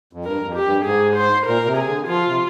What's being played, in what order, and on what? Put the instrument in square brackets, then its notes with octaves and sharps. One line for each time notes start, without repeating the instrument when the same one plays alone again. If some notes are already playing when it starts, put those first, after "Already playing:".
[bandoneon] F2
[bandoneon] G2 [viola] A#4
[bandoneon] F2
[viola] G4
[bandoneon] G2
[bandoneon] G#2 [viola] G#4
[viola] C5
[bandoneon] A#2 [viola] A#4
[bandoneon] A#2
C3
[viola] G#4
[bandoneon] D3
[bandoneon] F3 [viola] F4
[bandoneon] C3